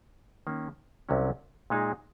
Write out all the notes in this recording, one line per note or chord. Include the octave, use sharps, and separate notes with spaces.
D#3 A#3 C#4
C2 C3 F#3 C#4
A#2 G#3 D#4 G#4